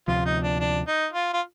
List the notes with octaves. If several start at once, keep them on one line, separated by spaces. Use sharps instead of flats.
D2 C3 F3 F4
D#4
D4
D4
D#4
F4
F4